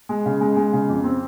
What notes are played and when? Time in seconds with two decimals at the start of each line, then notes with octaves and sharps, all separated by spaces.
0.09 G#3
0.26 C#3
0.41 G#3
0.56 G#3
0.73 C#3
0.89 F2
1.04 C4